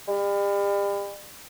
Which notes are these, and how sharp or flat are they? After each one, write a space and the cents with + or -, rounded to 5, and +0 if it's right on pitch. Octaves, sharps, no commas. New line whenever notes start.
G3 +40